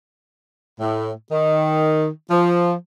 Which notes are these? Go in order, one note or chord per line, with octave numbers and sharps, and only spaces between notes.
A2
D#3
F3